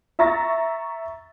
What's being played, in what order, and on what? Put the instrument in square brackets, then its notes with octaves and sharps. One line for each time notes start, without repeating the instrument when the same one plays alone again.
[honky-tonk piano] E5 A#5 C#6 A6 A#6